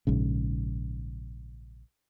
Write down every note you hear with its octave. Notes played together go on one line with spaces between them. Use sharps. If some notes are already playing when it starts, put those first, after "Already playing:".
A#1 G#2 C#3